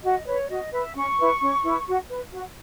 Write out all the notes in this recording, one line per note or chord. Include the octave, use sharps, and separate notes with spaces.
F#4 D#5
B4 C#5
F#4 D#5
B4 E5
C#4 C#6
E4 B4
C#4
E4 B4
F#4
B4
F#4